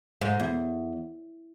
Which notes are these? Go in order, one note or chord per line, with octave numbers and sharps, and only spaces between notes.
G#2
E2